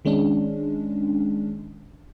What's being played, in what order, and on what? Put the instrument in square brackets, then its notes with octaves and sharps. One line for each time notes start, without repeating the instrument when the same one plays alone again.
[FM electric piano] D#3 G#3 C#4 D4